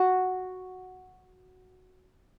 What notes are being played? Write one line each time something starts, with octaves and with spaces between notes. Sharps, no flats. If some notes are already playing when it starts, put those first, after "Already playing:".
Already playing: F#4